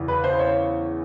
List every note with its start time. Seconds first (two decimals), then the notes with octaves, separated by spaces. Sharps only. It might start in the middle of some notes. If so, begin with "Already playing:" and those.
Already playing: E2 C#3 E3
0.08 B4
0.24 C5
0.39 C#5